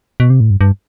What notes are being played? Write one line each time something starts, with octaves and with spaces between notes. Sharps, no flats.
B2
C3
A2
G2
G2